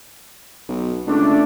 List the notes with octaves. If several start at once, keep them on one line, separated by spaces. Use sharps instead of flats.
B1
C#2 A3 D4